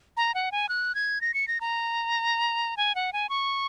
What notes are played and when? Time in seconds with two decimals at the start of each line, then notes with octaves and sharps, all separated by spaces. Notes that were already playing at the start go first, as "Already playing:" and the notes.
0.17 A#5
0.34 F#5
0.52 G#5
0.69 F#6
0.95 G#6
1.21 A#6
1.34 C#7
1.48 A#6
1.61 A#5
2.77 G#5
2.95 F#5
3.13 G#5
3.29 C#6